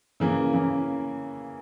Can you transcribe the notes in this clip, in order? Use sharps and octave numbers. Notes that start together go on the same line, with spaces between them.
C#3 E3 A#3
C#3 E3 A#3